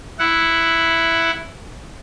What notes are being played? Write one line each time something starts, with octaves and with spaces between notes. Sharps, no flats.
E4 F#5